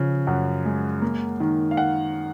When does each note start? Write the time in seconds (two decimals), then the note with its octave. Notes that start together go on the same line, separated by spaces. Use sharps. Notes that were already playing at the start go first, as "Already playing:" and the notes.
Already playing: C#3 F3
0.27 F#2 F#5
0.65 G#3
1.02 A#3
1.40 D#3
1.71 F5
1.77 F#5